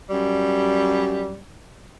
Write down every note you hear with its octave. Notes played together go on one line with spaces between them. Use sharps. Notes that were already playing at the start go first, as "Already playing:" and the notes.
F#2 G3